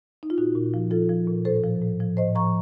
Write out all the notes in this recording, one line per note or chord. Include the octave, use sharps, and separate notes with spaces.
D#4
F4
A#2 D#4 F#4
A#2
F3
F3 F4 A4
F3
A#2
A2 A4 C5
F3
A2
F3
A2 C5 D#5
F3 A#5 C#6